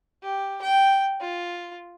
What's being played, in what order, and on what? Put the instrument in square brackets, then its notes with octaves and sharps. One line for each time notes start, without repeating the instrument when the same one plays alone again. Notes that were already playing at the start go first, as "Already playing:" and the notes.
[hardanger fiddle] G4
G5
F4